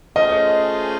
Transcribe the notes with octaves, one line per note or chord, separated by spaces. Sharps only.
A3 C#4 F4 G#4 C5 D#5